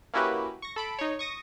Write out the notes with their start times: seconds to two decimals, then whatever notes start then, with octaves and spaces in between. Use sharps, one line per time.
0.14 A#3 C#4 E4 F#4 G4 B4
0.62 C#6 A#6
0.76 A4 B5 D7
0.99 D#4 C#5
1.19 C#6 D#6 A#6